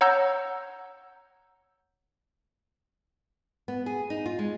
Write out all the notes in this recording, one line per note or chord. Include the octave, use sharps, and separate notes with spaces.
C#5 F#5 A#5 E6 G6
B3
G#4
D#4
F4
G#3